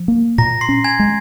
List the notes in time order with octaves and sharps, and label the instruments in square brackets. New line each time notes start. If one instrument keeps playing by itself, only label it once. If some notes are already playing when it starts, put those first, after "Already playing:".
Already playing: [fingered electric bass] F3
A#3
[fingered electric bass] A#2 [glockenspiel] A#5 A#6
[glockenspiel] C6 C7
[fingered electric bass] C#4
[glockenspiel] G#5 G#6
[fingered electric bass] G#3